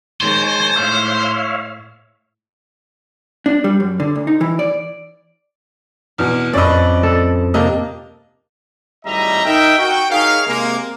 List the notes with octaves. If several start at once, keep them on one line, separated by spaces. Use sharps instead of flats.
D#3 G#3 C5 C#5 G#5 A5
A2 C#5 E5 F5
D4
G3
F#2
D3
D2
D#4
E3
D5
E2 B2 F6
F2 A2 C#4 B4 D5 D#5
A4
C3 A#3 D4 D#5
G#1 A2 G3 D#5 E5 A#5
D#4 A#4 E5 G5
F#4 G5
D#4 G#4 A#4 C#5 E5 F5
C3 G#3 A#3